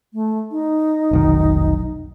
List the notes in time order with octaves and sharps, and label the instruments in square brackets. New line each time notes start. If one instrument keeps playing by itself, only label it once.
[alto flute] A3
D#4
[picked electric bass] F1 B1 D#3